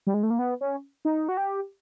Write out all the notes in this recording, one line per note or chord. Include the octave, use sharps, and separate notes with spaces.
G3
G#3
A3
A#3
B3
C#4
D#4
F#4
G4